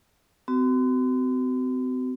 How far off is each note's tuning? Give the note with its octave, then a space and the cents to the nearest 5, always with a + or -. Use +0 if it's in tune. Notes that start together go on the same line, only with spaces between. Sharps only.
C4 -40 F#4 +25